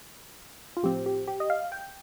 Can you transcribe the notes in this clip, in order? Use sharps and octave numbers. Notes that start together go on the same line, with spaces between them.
F4
A2 F3 C4 G4
G4
G4
D#5
F5
G5